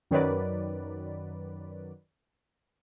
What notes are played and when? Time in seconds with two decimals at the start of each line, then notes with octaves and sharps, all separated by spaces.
0.11 F#2 D#3 F#3 B4 D5